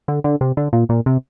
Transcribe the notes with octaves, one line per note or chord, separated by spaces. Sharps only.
D3
D3
C3
D3
A#2
A#2
C3